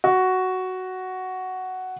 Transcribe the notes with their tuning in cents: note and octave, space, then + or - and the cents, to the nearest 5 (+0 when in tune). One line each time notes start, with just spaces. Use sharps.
F#4 +5